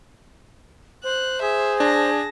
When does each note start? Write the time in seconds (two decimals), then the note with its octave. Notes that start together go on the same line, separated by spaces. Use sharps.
1.04 C5 F#6
1.42 G#4 E5
1.80 D4 A5 A#6